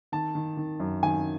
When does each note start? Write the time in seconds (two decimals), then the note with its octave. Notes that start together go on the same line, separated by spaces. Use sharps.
0.12 D#3 A5
0.35 D#3
0.57 D#3
0.80 F#2
1.03 D#3 G#5